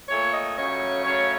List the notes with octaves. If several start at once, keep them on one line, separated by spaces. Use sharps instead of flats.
A#2 A3 C#5
D#5
F#2 C#3 A3 C#5
F#2 C#3 A3 C#5